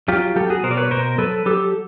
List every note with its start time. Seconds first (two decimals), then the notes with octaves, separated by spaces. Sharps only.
0.08 F#3 F4 G4
0.36 F#3 G4 A4
0.50 F#4 G#4
0.63 B2 A#4 C5
0.71 D5
0.77 B4 C#5
0.91 B2 A#4 C5
1.18 F#3 A4 B4
1.46 F#3 G4 A4